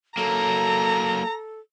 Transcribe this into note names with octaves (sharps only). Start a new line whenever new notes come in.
F#3 A#3 A4 A#5